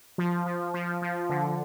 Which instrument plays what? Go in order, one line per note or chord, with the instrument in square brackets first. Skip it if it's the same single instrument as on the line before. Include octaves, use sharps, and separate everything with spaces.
[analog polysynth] F3
F3
F3
F3
D3